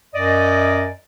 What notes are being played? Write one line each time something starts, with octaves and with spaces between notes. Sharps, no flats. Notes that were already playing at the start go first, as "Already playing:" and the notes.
F#2 D5 D#5